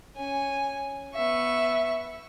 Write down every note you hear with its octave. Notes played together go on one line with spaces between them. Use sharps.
C#4 G#5
B3 E5 C#6